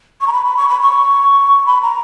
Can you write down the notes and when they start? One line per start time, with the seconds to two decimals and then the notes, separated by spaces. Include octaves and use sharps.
0.21 C#6
0.27 A#5
0.33 B5
0.45 B5
0.57 C#6
0.69 B5
0.80 C#6
1.66 B5
1.82 A#5